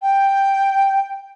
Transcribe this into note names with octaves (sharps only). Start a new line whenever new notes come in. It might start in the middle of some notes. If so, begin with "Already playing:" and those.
G5